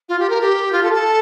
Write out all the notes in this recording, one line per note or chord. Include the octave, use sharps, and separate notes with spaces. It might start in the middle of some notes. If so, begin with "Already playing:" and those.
F4
G4
A#4
G4
F4
A4
A4